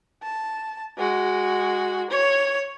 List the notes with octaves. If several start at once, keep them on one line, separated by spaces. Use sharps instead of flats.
A5
G#3 F#4
C#5